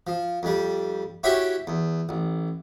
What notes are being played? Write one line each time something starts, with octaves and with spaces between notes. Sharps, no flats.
F3
F2 G3
E4 F#4 G4 C#5 E5 G5
E2
A1